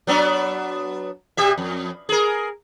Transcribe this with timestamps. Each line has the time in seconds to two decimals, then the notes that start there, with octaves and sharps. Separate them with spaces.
0.07 F#3 B3 D4
1.37 B2 G4 E5
1.58 F2
2.09 G#4 A#4